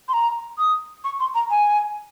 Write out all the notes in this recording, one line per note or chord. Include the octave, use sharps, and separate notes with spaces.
C6
A#5
D#6
C#6
C6
A#5
G#5